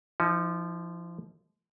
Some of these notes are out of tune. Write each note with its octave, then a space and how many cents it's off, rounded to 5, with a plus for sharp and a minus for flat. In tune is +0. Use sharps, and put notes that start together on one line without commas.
F3 -20 D#4 +35